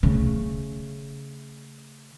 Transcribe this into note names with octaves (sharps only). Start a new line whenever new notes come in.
C#3 A3